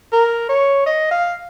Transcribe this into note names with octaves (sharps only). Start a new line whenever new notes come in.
A#4
C#5
D#5
F5